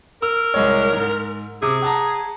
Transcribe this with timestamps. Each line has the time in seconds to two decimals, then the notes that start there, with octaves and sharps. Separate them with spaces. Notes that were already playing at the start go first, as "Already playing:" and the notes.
0.22 A#4 E6
0.54 C2 G#3 C#5
0.93 G#2
1.62 C3 G#4
1.82 F#5 A5 A#5